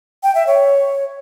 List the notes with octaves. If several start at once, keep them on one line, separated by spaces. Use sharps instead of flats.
G5
E5
C#5